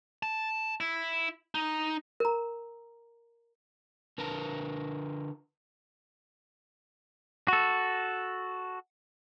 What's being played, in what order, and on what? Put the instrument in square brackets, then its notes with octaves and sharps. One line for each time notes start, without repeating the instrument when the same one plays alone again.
[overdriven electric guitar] A5
E4
D#4
[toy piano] A#4 A#5
[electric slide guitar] D3 A#4 B4 A5 A#5
[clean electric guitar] F#4 A4